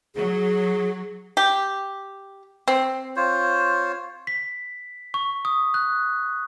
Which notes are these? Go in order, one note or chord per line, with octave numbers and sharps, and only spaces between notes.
F#3 G#4
G4
C4
F4 C5 C#5
B6
C#6
D#6
F#6